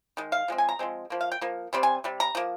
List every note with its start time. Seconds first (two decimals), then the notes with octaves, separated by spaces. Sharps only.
0.17 D#3 G#3
0.32 F5
0.48 F3 G#3 C4
0.58 G#5
0.69 A#5
0.79 F3 G#3 C4
1.10 F3 A#3
1.21 F5
1.32 G5
1.41 F3 A#3
1.73 C3 G3 C4
1.83 G#5
2.04 C3 G3
2.20 A#5
2.35 F3 A#3